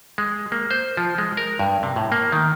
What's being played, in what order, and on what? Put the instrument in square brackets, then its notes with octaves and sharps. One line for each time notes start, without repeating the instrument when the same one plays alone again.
[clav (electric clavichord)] G#3
A#3
C5
F3
G#3
A#4
G2
C3
A2
A#3
D#3